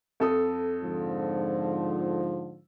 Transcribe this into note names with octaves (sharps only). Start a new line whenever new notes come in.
F2 A4 D#6
G#2 D3 F3